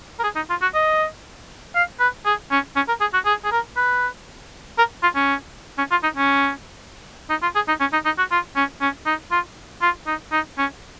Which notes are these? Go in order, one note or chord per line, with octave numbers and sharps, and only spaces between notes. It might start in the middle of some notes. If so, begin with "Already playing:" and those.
A#4
G#4
D#4
F4
F#4
D#5
F5
B4
G#4
C#4
C#4
A#4
G#4
F#4
G#4
G#4
A#4
B4
A#4
F4
C#4
C#4
F4
D#4
C#4
D#4
F4
G#4
D#4
C#4
D#4
D#4
F#4
F4
C#4
C#4
D#4
F4
F4
D#4
D#4
C#4